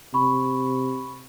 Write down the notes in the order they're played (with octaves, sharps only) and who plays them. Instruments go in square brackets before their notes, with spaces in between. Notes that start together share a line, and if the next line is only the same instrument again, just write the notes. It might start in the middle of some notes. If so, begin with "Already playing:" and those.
[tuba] C3 [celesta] B5 C#6